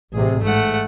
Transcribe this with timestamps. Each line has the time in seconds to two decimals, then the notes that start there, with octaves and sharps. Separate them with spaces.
0.13 A1 C3 G#4
0.42 G#2 A3 F#5